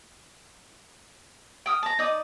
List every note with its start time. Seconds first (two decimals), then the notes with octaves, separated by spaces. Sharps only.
1.66 G5 D#6 F6
1.83 A5 A#5
1.99 D#4 D5 D#6